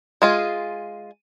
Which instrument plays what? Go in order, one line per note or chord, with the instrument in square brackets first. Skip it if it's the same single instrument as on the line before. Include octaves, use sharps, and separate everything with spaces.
[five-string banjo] G#3 F4 G#4